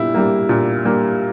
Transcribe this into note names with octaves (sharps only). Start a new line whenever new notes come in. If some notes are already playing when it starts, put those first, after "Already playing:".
Already playing: A#2 G3 E4
G3 A#3
A#2
G3 A#3